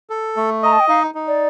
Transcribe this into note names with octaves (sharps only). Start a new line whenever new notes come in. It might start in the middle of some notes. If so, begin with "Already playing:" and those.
A4
A3
D#5 A#5
A5
G5
D#4 F5
D#4
D5